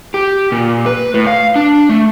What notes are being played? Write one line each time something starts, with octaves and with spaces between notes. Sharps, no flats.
G4
A#2
B4
A2
F5
D4
A3